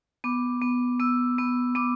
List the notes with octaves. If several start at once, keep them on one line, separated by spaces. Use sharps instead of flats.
B3 D6
B3
B3 E6
B3
B3 D6